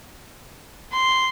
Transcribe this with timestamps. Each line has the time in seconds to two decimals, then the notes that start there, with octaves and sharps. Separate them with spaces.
0.92 C6